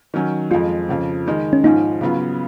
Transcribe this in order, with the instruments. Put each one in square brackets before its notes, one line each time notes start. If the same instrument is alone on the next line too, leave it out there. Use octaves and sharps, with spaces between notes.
[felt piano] D#3 F#3 C#4
[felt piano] F2 F3 G#3 [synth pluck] F4
[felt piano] F2 C#3 F3
D#3 G#3 D#4
[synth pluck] C#4
[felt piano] G#2 F3 G#3 C#4 [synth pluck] D#4
[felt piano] C#3 F#3 B3 F4